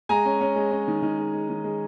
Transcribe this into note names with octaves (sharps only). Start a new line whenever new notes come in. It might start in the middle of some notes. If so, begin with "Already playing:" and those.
G#3 G#5 A#5
C#4
C#4
G#3
C#4
D#3
D#3
G#3
G#3
D#3
G#3